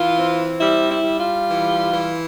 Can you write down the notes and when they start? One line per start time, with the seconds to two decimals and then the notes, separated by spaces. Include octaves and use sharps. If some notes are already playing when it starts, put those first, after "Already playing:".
Already playing: E3 F4
0.17 C4
0.60 G3 E4
0.91 E4
1.05 G3
1.20 F4
1.50 E3
1.94 E3